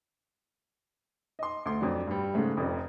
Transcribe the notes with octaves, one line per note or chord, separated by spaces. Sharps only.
D#5 C6
D2 C6
F2 F#3 D4
G2 G3
G#2 C#3 G#3 A3
F1 F2